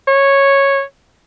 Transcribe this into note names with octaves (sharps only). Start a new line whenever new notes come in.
C#5